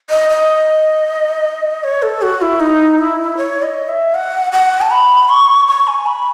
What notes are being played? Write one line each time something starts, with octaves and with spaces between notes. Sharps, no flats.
D#5
D#5
C#5
A4
F#4
E4
D#4
E4
C#5
D#5
E5
F#5
F#5
A5
B5
C#6
C#6
G#5
B5